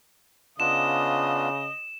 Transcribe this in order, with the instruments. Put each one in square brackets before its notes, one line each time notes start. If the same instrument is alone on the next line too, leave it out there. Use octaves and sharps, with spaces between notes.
[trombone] C#3 [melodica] B3 D4 F4 [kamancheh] D#5 [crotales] E7